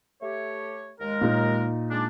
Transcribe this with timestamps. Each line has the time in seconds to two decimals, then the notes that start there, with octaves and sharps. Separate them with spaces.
0.22 A3 G4 C#5
1.00 D#2 G#3 A#4
1.21 A#2 D#4
1.91 G#3 D4